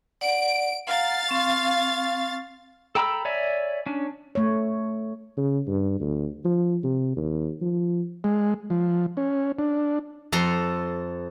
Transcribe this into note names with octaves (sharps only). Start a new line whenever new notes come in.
D5 F#5 D7
F5 F#5 A#5 A6
C4 C#6
A4 G5 A#5 B5 E6
C#5 D5 E5 G#5
C#4 D4
A3 C#5
C#3
G2
D2
F3
C3
D#2
F3
G#3
F3
C#4
D4
F2 A4 A#5 C6